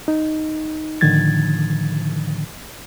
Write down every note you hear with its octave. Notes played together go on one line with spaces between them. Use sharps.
D#4
A2 D3 D#3 F3 G#6 A6